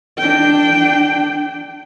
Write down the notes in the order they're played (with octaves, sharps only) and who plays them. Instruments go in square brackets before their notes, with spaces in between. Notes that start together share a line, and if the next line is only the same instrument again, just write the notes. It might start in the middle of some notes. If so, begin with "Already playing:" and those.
[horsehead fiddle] D4 G5